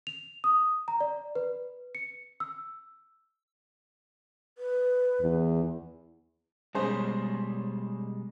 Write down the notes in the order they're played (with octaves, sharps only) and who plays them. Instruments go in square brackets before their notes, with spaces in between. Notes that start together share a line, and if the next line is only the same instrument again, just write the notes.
[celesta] F7
D#6
A#5
D5
B4
C#7
E6
[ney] B4
[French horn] E2
[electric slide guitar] B2 G3 G#3 [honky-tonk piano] C#4 G#4 C5